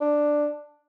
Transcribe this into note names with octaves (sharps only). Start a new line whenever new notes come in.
D4